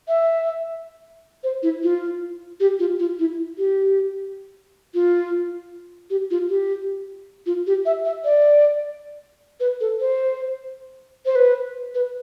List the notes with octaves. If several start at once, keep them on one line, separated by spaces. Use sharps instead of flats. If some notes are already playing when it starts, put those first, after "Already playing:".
E5
C5
E4
F4
G4
F4
F4
E4
G4
F4
G4
F4
G4
F4
G4
E5
E5
D5
B4
A4
C5
C5
B4
B4